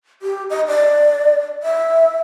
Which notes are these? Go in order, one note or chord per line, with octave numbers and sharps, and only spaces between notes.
G4
D#5
D5
E5